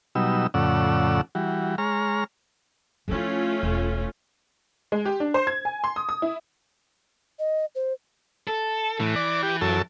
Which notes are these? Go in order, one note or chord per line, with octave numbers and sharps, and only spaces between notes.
B2 F#3 G3 D#4 E6
F2 A2 C#3 D5 F#5 E6
E3 G3 F#4
G#3 C#5 A#5 F6
F3 A3 C#4 E4 F4
E1
G#3
G4
D4
C5
G#6
G#5
C6
D#6
D#6
E4
D#5
C5
A4
A2 E3
D5
G4
F#2 A4